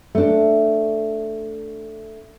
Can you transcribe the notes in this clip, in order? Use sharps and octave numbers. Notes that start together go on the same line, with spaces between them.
A3 D4